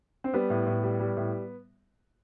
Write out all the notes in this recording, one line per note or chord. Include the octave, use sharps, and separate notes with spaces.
C4
G3 B3
A2
A2
G3
G3
A2